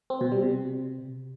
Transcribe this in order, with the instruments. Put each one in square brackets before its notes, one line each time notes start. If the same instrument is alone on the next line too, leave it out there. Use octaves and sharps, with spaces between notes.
[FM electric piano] C4
B2
G3
C3